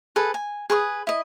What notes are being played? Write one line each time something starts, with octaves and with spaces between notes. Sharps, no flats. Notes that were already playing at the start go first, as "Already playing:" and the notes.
G#4 A4 B4
G#5
G#4 B4 C#6 D#6
E4 D#5